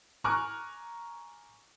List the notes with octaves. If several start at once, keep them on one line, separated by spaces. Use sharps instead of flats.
G#5 A#5 C#6 D6 F6 F#6